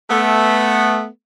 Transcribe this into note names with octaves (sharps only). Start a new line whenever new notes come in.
A3 B3